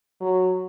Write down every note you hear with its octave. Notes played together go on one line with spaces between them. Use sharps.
F#3